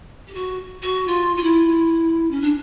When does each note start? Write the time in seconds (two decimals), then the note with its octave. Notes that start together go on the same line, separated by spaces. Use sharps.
0.27 G4
0.34 F#4
0.82 F#4
1.07 F4
1.36 F4
1.43 E4
2.30 C#4
2.41 D4